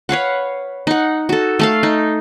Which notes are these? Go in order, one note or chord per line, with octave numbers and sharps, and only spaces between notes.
B4 C#5 F5 F#5
D#4 F#5
F#4 A4
A3 A4 F5
D#4